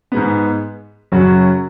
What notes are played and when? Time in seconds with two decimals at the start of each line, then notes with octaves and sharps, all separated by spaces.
0.12 G#2 G#3 B3
1.12 F#2 C#3 F#3 C#4 F#4